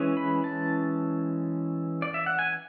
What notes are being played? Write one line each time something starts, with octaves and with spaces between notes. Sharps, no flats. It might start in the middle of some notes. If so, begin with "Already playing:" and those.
Already playing: E3 G#3 C#4
B5
A5
D5
E5
F#5
G#5